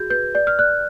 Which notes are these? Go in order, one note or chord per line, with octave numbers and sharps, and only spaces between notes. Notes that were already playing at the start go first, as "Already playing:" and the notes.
Already playing: F#4 G#4 G6
B4 G6
D5 G6
F6
D5 F#6